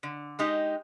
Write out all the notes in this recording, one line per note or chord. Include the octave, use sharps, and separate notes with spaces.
D3
G#3 D#4 G4